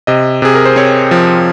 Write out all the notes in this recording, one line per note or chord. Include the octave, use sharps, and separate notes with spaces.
C3 D#5
C3 G#4
A#4
C5
C4 C#5
F3